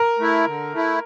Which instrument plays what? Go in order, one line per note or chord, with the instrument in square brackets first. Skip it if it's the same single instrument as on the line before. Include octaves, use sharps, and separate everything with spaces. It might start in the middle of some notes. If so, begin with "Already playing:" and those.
Already playing: [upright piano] A#4
[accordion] A3 E4
D3
A3 E4